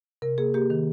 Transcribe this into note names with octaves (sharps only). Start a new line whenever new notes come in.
C3 A#4
A#3 G#4
A#3 G4
D#3